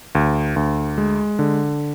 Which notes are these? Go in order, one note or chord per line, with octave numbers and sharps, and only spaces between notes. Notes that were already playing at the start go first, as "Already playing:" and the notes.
D2
D2
G#3
D3